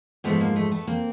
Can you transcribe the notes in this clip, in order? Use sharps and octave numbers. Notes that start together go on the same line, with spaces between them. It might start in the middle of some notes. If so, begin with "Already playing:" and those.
G#2 F3 G#3 A3 B3
A#3
A3
A3 B3
A#3 C4